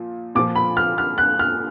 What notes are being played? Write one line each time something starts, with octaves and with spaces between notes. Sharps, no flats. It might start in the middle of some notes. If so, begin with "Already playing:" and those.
Already playing: A#2 F3
A#2 F3 D6
B5
F6
F6
F#6
F6